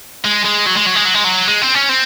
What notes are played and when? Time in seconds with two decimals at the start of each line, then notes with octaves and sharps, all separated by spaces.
0.25 G#3
0.45 G#3
0.66 F#3
0.76 G#3
0.86 F#3
0.95 G#3
1.05 F#3
1.14 G#3
1.24 F#3
1.48 G#3
1.62 C4
1.74 C#4
1.89 C4